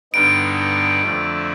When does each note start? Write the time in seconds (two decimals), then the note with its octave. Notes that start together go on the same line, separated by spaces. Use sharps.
0.13 G2 D3 G3 B3 D#4 D7
1.02 F2 D3 F3 A3